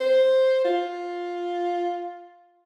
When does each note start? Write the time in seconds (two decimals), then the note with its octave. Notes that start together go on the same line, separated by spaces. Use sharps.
0.01 C5
0.65 F4